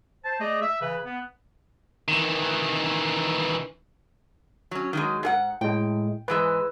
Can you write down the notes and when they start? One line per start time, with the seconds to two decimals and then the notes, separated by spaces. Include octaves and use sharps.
0.24 C5 A5
0.40 A3 G#4 D5 D#5
0.61 E5
0.81 C#3 E3 B4
1.05 B3
2.08 D#3 E3
4.71 F#3 C#4
4.93 D#3 F#3 G#3
5.23 G#2 G#4 F#5
5.61 A2 G#3 G5
6.28 G#2 E3 G#3 B4 E6